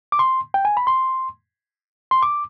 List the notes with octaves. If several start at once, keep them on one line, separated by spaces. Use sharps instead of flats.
D6
C6
G5
G#5
B5
C6
C6
D6